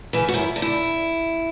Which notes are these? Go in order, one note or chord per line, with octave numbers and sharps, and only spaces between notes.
C#3 E3
F#4
F#2 E4
D3
E4